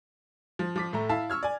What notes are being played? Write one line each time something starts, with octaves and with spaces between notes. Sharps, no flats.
F3
F3 D6 B6
A2 A3 A#5
E4 F5 A5
C#6 E6 F6 G#6
D5 G#5